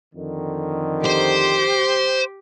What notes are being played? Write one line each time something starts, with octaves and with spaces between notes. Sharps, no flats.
F2 D3 D#3
G4 C5